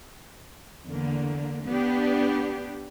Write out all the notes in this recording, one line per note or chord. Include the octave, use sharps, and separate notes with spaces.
E2 D3 A#3
B3 D4 G4